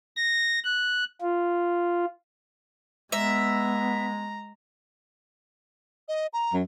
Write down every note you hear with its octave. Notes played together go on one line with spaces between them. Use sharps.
A#6
F#6
F4
G#3 B3 E5 A#5
D#5
A#5
F#2